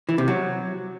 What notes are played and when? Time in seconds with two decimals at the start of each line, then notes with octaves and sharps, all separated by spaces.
0.09 E3
0.18 C3
0.28 F#3